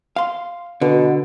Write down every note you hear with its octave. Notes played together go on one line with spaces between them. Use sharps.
F5 C6
B2 D3